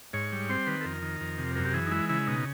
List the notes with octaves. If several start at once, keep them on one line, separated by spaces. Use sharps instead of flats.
G#2 C#5
G3
C4 C5
D#3 B4
A4
F2 A#4
D#3
F2
C3
F#2 A#4
G4
E3 G#4
D#4
G#3 E4
C#3 E4
B2 D#4